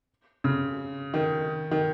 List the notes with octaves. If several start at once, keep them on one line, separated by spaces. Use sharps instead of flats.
C#3
D#3
D#3